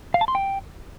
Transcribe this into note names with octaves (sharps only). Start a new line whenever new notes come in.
F5
A5
C6
G5